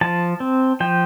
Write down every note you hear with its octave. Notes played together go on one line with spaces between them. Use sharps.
F3 A5
C4
F3 G5